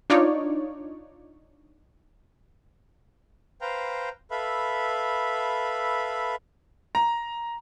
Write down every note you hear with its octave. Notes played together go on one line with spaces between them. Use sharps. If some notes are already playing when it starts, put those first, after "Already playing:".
D4 D#4 F4 C#5 D5
B4 C5 F5 G5 A#5
A4 B4 E5 F5 B5
A#5